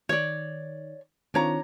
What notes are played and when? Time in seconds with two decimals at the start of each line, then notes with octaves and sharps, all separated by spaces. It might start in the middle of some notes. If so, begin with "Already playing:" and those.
0.09 D#3 C#5 D5
1.34 D#3 C4 D4 F4 C#5 A#5